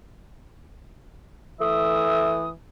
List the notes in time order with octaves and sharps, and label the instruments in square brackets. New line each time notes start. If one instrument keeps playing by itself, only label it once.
[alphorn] E3 [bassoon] A3 [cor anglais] E5 [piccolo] D#6